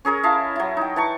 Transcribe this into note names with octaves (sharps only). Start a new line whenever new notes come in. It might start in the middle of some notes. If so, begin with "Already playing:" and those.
C#4 G#4 A#4 C#5
E4 D#5 F5 A5
F#3 E4
D#4 G5
E3 A5 C#6